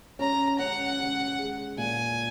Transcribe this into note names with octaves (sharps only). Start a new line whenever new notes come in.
C#4 A#5
C#4 F#5
C#4
G#3
A#2 G#5